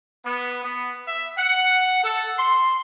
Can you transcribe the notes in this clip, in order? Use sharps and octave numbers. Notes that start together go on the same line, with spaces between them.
B3
B3
E5
F#5
A4
C6